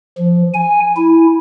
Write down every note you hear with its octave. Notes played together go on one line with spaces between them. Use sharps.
F3
G#5
E4